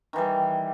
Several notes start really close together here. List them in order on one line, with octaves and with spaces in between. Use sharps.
D#3 E3 G3